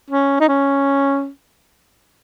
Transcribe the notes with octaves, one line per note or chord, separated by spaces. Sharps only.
C#4
D#4
C#4